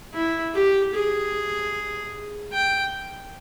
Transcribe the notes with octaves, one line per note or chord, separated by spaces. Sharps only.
E4
G4
G#4
G5